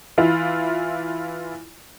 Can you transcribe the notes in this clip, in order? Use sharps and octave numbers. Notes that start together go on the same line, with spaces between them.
E3 E4 F4